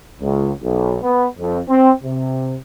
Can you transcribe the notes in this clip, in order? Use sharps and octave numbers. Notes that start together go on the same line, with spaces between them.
C#2
B1
B3
F2
C4
C3